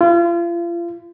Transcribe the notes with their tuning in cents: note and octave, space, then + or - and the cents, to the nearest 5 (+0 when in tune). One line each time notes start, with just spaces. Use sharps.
F4 -35